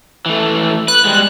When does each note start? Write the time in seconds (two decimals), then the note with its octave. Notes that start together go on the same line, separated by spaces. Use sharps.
0.26 E3 A3
0.88 B4 F#6
1.05 G3 G#3